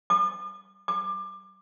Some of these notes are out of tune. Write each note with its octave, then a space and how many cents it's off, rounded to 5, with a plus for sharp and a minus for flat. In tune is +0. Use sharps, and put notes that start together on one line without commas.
D6 +45
D6 +25